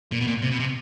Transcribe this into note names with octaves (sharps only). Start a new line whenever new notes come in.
A#2
B2
A#2
C3
B2
C3